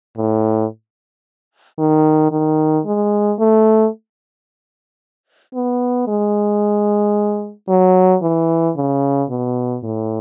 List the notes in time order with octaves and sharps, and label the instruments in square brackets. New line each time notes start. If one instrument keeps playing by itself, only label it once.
[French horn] A2
D#3
D#3
G#3
A3
B3
G#3
F#3
E3
C#3
B2
A2